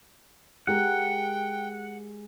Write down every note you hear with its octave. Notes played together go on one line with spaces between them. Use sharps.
G#3 G4 A#4 F#5 G5